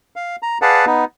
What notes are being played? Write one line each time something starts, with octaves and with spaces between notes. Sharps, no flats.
F5
A#5
G#4 B4 D5 F5 F#5 A5
B3 D#4